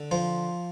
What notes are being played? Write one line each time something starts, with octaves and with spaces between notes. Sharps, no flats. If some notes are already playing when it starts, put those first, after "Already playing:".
Already playing: D3
F3 C5